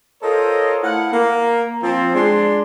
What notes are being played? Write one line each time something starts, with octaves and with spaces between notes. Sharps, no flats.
F4 A4 A#4 C5 C#5 D#5
A3 E4 F5 F#5
A#3
F3 C4
G#3 D4 C6